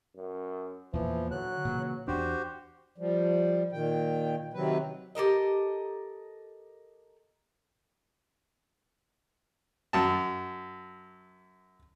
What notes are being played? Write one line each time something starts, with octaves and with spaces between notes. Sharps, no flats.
F#2
E2 A#2 E3 F3
D3 F#3 F#6
A#2 C#3 E3
E2 D4 F#4 G4 C5
F3 G3
A#2 D#3 G5
C3 D#3 F#3 C4 B4
G4 A4 A#4 D#5
F#2 A5